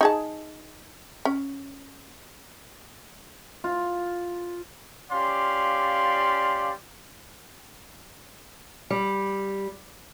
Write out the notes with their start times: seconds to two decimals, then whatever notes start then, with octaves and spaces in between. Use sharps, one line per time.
0.01 D#4 G#4 A5
1.25 C#4
3.64 F4
5.11 C#4 F4 G4 D5 F5 C6
8.90 G3